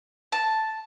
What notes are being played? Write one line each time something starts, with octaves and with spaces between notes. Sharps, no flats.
A5